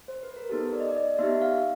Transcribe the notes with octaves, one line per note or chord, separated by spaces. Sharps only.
C5
B4
A#4
B3 D#4 G4 A4
D5
D#5
D5
D#5
B3 D#4 G4 E5
F5